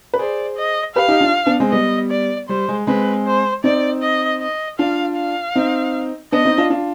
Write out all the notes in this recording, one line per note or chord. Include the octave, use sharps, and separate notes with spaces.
B4
G#4 C5 D5
D#5
G4 B4 F5
D#4 G4
D4 F4
B3 D4
G#3 C4
G3 B3 D#5
D5
G3 C5
G#3
G#3 C4 B4
C5
C4 D#4 D5
D#5
D#5
D4 F4 F5
F5
C4 D#4
B3 D4 D#5
C4 D#4
D4 F4
D4 F4